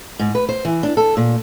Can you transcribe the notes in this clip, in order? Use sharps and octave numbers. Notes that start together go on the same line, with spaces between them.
G#2
B4
C5
E3
D4
A4
A#2